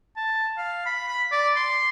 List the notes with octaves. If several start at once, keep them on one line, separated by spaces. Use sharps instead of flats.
A5
F5
B5
B5
D5
C6